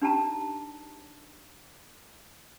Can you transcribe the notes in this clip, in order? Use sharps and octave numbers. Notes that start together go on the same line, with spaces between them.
D4 D#4 G4 G5 A5 A#5